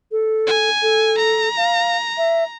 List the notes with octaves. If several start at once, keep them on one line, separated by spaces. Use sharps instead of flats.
A4
G#5
A4
A#5
F5
E5